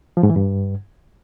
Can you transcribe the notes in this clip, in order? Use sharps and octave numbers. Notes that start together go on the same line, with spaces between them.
F3
G#2
E3
G2